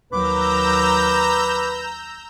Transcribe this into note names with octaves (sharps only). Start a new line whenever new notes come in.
D#2 F#3 B4 A#5 D6 E6 G6